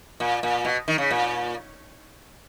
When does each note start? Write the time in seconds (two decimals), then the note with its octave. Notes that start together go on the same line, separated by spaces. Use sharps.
0.20 A#2
0.43 A#2
0.65 B2
0.88 D#3
0.98 C#3
1.11 A#2